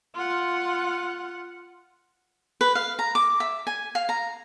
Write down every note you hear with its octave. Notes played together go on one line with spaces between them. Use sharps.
F4 F#5
B4
F5
A#5
D6
E5
G#5
F5
A#5